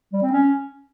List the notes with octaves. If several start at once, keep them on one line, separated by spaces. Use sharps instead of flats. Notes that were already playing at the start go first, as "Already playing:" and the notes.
G3
C4
C#4